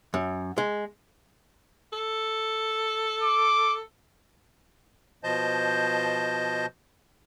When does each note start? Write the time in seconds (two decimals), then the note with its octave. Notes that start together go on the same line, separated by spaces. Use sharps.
0.14 F#2
0.58 G#3
1.93 A4
3.23 D6
5.24 B2 F3 C5 D#5 A5 G6